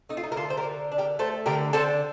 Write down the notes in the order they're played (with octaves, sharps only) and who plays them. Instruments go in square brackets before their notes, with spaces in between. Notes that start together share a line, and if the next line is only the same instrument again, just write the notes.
[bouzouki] A3 D#4
F4
D#4
A#4
D3 F4 A4
C5
G4 A#4
D3
D4
G4 A#4
A3 A4 C5
D3 G4 A#4
D3 A4 C5